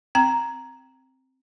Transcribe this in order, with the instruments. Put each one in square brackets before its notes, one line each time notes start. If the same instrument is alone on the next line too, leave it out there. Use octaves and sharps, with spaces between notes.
[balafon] C4 A#5